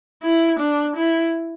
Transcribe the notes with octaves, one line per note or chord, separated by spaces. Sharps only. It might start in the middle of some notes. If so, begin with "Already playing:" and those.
E4
D4
E4